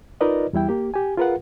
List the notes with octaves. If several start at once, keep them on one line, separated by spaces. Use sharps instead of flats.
D#4 F4 A#4 B4 D5 D#5
E2 G3 E4 G5
A#3 G4
G4 G#5
F4 G#4 A#4 B4 F5 F#5